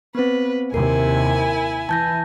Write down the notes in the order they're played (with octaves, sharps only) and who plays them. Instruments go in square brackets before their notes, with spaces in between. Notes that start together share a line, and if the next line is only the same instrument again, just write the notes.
[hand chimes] B3 C4 [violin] B4
[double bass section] D#2 C3 [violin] E4 G#5 [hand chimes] A#4
[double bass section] E3 [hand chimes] A5 G6 A#6